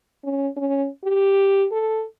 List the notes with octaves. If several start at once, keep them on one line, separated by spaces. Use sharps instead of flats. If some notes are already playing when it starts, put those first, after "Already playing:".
C#4
C#4
G4
A4